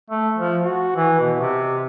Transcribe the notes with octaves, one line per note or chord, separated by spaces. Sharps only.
A3
F3
F#4
E3
B2
C3